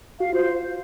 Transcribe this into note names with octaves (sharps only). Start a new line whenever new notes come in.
F#4 F5
F4 C5